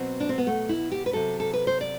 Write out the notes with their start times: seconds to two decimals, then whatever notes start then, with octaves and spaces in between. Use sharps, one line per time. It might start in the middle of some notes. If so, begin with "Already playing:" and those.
Already playing: B2 F#3 C4
0.20 D4
0.29 C4
0.38 B3
0.47 A3
0.69 E4
0.92 G4
1.06 B4
1.13 C3 F#3 A4
1.40 A4
1.53 B4
1.67 C5
1.81 D5